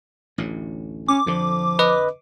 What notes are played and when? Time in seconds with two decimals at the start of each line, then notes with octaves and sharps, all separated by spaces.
0.38 A1 D2 A2
1.08 C#4 D6
1.26 F2 D3 F3
1.79 B4 D#5